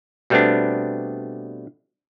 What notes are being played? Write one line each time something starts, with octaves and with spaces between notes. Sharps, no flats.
B2 G3 A3 B3 C4 D4